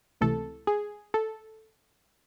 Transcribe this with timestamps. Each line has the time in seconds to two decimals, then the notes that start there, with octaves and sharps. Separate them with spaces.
0.21 C#2 C3 E3 A3 A4
0.67 G#4
1.14 A4